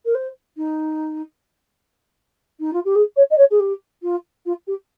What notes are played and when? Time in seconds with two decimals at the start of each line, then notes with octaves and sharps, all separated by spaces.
0.05 A#4
0.15 C5
0.57 D#4
2.60 D#4
2.73 F4
2.85 G4
2.95 G#4
3.16 C#5
3.31 D#5
3.38 C#5
3.51 G#4
3.60 G4
4.03 F4
4.46 F4
4.67 G4